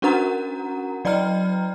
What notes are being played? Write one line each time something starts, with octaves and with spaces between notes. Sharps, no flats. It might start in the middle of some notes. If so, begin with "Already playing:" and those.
C#4 D4 F#4 A#4 F#5 A#5
F#3 D5 D#5 G5 A#5 F6